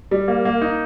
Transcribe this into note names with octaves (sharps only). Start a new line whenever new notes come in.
G3
A#3
A#3
D#4